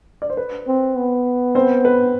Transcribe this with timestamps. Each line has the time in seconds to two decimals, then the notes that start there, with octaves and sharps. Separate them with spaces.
0.22 D5
0.30 C5
0.37 B4
0.67 C4
0.96 B3
1.55 C4 C5
1.85 B4